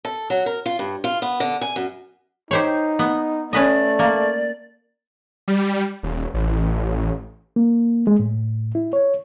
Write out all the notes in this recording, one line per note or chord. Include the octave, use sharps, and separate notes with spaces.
A4
F#3
A#4
F4
G2
F4
B3
D3
G#5
F#2
D#4 G4 C5 C#5
B3
A3 C#4 B4 D5 D#5
A#3
G3
D#1
A1
A#3
G#3
A2
E4
C#5